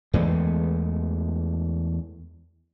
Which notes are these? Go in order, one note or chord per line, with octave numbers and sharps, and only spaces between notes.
E2 E3 G#3 A3